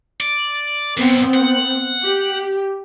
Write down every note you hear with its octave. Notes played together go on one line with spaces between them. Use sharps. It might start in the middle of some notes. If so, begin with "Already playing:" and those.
D5
F#2 A#2 B3 C4
F#5
G4